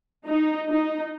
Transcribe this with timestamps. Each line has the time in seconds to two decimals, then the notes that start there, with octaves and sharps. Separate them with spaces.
0.26 D#4
0.69 D#4